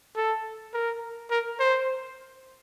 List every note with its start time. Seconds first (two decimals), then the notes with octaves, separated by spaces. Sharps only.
0.16 A4
0.74 A#4
1.31 A#4
1.60 C5